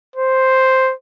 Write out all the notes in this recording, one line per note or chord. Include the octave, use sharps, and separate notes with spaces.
C5